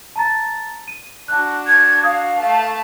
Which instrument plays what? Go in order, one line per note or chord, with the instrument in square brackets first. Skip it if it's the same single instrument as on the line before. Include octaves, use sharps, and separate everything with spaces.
[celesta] A5 A#5 A6
D#7
[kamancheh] D4 F#4 [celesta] A5 F#6
[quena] G#6
[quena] F5 [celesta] D#6
[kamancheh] A3 A5